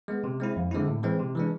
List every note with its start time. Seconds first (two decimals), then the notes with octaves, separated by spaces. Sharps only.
0.08 G#3 B3
0.24 C3
0.40 G#3 C4 E4
0.56 F2
0.71 D3 G#3 C4 E4
0.88 A2
1.03 E3 G#3 C4
1.19 C3
1.35 E3 G#3 D4